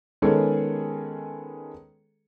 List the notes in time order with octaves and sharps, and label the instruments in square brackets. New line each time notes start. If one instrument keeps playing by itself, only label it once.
[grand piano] D#3 G#3 B3 C#4 G#4 A4